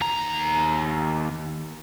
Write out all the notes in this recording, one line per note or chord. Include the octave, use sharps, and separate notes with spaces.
D#2 A#5